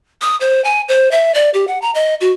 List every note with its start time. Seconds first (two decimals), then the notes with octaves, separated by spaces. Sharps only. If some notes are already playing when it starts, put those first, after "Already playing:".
0.22 D#6
0.41 C5
0.65 G#5
0.88 C5
1.11 E5
1.34 D5
1.54 G4
1.68 F#5
1.82 A#5
1.95 D#5
2.21 F#4